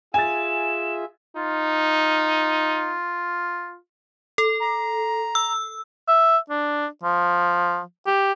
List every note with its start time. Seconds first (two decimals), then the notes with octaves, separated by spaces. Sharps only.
0.14 F4 G#4 E5 G#5 A6 E7
1.36 D#4 F4
4.38 A4
4.60 A#5
5.35 E6
6.08 E5
6.50 D4
7.03 F3
8.06 G4